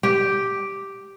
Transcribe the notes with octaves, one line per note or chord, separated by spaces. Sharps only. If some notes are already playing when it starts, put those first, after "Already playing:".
G4